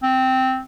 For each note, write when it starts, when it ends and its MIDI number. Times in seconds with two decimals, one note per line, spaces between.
0.03 0.60 60